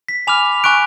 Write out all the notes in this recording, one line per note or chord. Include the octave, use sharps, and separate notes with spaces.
B6
G#5 B5 D6 F6 F7
G#5 C#6 F#6 D7